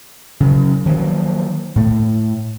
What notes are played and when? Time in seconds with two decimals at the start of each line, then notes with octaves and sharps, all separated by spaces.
0.40 C#3 F#3
0.86 D#3 F3 F#3 A#3
1.76 A2 A3